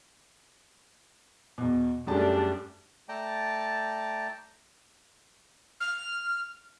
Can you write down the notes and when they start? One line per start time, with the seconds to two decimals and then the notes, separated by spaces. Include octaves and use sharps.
1.58 E2 B2
2.07 F#2 G3 A3 D4 G#4 A5
3.09 A3 D5 G5 A5 A#5
5.80 F6